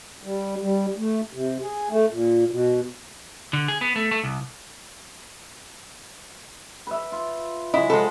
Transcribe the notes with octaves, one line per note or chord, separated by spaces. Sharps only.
G3
G3
A3
C3
G#4
A3
A#2
B2
D3
G#4
B3
A3
A3
C2
B4 E5
F4
F#3 G#3 E4 D#5
F3 G#3 A4 B5